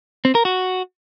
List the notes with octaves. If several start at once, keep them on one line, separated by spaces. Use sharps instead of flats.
C4
A#4
F#4